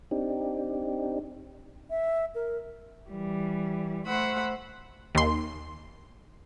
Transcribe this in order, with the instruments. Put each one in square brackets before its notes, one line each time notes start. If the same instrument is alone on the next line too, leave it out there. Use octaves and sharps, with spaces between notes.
[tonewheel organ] C4 D4 D#4 G4
[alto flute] E5
A#4
[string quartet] E3 G3
A3 C5 F#5 B5 E6
[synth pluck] D#2 C6